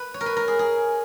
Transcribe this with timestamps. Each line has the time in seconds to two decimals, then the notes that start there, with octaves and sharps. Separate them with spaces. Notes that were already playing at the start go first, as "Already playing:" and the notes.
Already playing: B4
0.14 C#5
0.21 A#4
0.26 B4
0.36 A#4
0.48 G#4
0.59 G#4